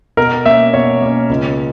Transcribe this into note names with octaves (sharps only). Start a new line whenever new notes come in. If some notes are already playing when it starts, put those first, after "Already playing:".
B2 A#4
A#3 C#4 E5
B2 C#5
A#3 C#4
C#2